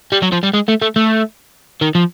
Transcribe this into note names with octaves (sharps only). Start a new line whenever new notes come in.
G3
F#3
F3
G3
G#3
A3
A3
A3
D#3
F3